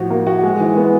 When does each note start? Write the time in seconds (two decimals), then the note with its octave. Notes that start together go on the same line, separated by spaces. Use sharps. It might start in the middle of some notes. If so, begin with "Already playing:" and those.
Already playing: A2 F3 F#4
0.10 A#3
0.27 F#4
0.43 G#3
0.60 E3
0.77 B3